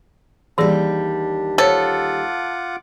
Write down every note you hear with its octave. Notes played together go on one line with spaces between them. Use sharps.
D#2 E3 G3 D4 G#4 D5
F4 A4 C5 C#5 F#5 D6